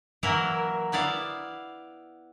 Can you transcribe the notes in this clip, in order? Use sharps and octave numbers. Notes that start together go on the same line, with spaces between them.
E3 F#3 A#3 E4 A#4
B3 E4 D5 F5